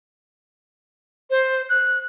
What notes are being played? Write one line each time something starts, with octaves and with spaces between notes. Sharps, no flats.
C5
F#6